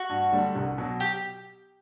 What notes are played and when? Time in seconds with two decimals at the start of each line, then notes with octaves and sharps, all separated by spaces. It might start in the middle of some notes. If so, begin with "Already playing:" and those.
Already playing: F#4
0.10 G2
0.32 D3 G3 D4
0.56 C2
0.78 B2 F#3
1.00 G4